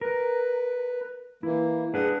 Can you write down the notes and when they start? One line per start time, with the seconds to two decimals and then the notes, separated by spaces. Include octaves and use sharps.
0.01 A#4 B4
1.43 E3 A#3 E4
1.94 D4 G#4 B4 F#5